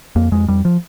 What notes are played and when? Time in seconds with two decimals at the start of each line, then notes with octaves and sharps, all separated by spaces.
0.16 F2 A#3
0.32 F2 G#3
0.48 F2 G3
0.65 F3